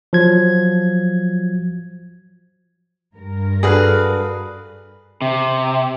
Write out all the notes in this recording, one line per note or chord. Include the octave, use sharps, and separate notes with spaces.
F3 F#3 G#6
G2 A#4
D4 F#4 G#4 A4 B4 F5
C3